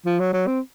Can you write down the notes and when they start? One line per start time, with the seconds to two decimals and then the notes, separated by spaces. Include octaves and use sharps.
0.06 F3
0.20 F#3
0.33 F#3
0.47 C4